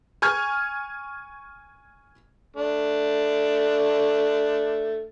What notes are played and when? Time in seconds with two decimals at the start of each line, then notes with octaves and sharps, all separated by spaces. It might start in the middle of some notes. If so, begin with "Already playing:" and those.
0.22 G#5 C#6 F6 G#6
2.56 A3 D4